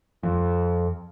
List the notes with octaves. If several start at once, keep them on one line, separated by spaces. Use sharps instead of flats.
F2